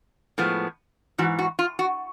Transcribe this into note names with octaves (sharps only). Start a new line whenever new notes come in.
A2 F3 G#3 B3
G#2 E3 F#4
F#4
F4
F#4